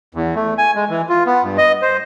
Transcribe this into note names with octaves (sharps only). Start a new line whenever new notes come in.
E2
A3
G#5
G#3
E3
F4
B3
G2
D#5
C5